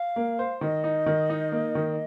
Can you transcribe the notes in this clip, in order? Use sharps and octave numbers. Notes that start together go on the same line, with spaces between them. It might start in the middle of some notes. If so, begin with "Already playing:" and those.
Already playing: F5
A#3
C5
D#3 D#5
D#4
D#3
D#4
A#3
D#3